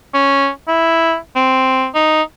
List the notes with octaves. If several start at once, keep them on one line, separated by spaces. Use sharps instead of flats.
C#4
E4
C4
D#4